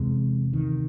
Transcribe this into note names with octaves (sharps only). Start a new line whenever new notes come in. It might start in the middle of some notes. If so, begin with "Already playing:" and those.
Already playing: E2 C3 G#3
D#3